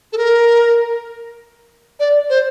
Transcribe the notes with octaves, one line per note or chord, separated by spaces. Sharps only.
A4
A#4
D5
C5